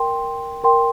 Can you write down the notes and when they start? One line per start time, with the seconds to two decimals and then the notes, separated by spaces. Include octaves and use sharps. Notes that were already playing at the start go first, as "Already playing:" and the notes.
Already playing: A#4 G5 C6
0.64 A#4 G5 C6